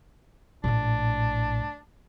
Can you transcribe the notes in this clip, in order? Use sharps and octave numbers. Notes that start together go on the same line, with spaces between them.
A#1 A2 D4